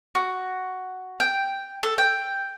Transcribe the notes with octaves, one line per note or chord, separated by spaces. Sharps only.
F#4
G5
A4
G5